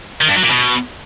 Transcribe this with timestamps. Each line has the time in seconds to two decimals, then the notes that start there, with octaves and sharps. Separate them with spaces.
0.21 D#3
0.28 G2
0.36 F#3
0.43 A#2
0.50 B2